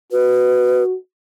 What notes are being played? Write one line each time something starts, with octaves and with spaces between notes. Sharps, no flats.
F#4 B4